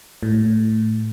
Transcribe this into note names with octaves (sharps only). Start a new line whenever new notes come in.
A2